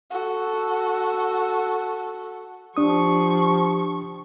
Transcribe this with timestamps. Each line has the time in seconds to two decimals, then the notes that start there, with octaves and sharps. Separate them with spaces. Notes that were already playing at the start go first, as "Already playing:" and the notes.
0.11 F#4 A4
2.77 F3 D4 G4 C#6 D#6